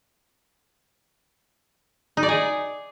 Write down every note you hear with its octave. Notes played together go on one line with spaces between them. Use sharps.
D#4
D5
G#4